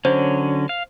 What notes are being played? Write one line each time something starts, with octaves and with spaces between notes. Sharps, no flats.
D3 F#3 C#4 C5
F5